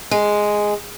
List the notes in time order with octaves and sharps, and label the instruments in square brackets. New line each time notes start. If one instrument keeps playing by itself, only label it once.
[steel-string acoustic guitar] G#3